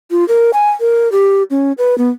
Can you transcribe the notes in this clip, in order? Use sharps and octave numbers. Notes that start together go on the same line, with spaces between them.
F4
A#4
G#5
A#4
G4
C#4
B4
B3